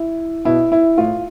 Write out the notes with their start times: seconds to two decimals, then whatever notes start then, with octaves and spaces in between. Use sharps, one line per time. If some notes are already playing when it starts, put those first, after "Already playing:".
Already playing: E4
0.45 B2 E4
0.72 E4
0.98 A2 F4